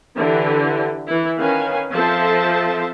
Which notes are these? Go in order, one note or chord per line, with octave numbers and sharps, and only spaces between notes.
D3 E3 E4 G4
E3 E4
D#3 C#4 B4 F5 G#5
F3 C4 A4 C5 E5 A5